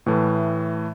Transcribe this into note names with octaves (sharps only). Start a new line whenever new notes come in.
A2 E3 A3